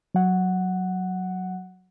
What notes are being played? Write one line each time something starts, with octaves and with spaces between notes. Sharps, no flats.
F#3 F#5